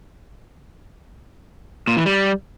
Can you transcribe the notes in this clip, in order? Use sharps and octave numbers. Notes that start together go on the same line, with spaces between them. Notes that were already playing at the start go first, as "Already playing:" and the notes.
A#2
E3
G3